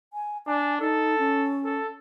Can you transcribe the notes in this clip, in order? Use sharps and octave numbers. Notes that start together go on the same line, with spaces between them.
G#5
D4 G#5
D#4 A4
C#4
A4